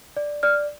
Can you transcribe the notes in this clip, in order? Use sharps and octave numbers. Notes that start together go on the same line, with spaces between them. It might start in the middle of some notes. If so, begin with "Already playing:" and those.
D5
D5 F6